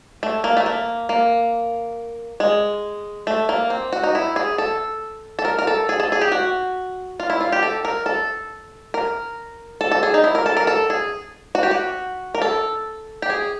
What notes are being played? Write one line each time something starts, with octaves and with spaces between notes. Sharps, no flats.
A3
A#3
A3
A#3
A#3
G#3
A3
A#3
C4
F#4
D#4
E4
G#4
A4
A4
A#4
A#4
A4
G#4
A4
G#4
G4
F#4
F4
E4
F4
G4
A4
A#4
A4
A#4
A4
A4
G#4
D#4
E4
A#4
A4
A#4
A4
G#4
F#4
G4
F#4
A#4
A4
G4
G#4